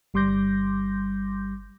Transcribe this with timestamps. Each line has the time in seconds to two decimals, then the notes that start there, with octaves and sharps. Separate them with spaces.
0.14 G1 G3 C6 D6 G6 A#6